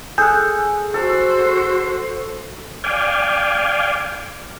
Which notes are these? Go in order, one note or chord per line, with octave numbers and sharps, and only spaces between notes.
G#4 A4 F#6 G6
F#4 A4 C5
D5 F5 G5 G#5